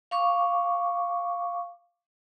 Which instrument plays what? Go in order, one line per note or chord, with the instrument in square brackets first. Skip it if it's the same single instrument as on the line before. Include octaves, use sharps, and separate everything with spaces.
[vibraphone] F5 C#6 D6